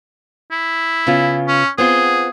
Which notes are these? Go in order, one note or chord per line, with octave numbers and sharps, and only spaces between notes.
E4
C#3 B3 F4
C#4
B3 C4 F4 G#4